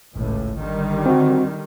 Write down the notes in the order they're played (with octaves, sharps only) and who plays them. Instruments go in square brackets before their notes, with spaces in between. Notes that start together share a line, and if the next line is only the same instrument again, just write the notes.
[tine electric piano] G#1 [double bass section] C#2 A2
[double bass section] D3 D#3 G3
[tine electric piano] C4 F#4